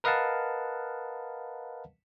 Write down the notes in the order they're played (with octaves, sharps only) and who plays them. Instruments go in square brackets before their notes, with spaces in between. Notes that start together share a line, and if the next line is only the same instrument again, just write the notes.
[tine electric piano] A#4 B4 D#5 F5 F#5 A5